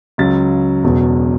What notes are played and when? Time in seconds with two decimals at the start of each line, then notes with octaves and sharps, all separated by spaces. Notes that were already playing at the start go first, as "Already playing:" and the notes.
0.18 C#2 C#3 F#3 A6
0.84 E1 E2 B2 F#3